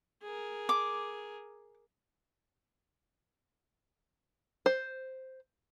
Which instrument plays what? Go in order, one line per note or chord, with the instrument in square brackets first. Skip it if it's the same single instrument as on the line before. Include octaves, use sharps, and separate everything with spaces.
[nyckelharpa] G#4 A#4
[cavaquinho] D6
[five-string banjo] C5